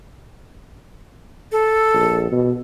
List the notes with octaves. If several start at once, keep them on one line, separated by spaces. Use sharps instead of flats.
A4
A#1
B2